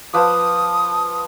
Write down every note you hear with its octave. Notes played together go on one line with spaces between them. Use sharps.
F3 B4 D6 D#6